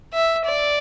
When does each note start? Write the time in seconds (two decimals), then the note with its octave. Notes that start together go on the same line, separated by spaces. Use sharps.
0.13 E5
0.46 D5